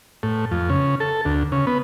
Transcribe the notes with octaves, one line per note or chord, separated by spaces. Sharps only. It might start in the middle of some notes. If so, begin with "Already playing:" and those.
A2
F2
C#3
A4
D2
C#3
B3